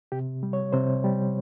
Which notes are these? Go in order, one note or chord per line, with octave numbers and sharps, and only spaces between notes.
C3 G4
G3
C#5
C3 C5
G3